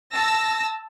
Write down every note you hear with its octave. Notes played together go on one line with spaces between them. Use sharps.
A5 E6 A#6